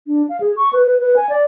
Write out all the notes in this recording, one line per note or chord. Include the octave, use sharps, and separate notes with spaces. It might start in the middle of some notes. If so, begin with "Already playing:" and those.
D4
F5
G#4
C#6
B4
B4
B4
G#5
D5